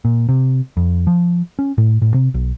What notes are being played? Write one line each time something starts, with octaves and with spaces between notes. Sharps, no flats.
A#2
C3
F2
F3
C#4
A2
A2
C3
B1